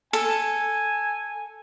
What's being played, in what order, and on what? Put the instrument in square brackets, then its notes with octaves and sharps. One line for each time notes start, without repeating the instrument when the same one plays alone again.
[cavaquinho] A4 [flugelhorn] G#5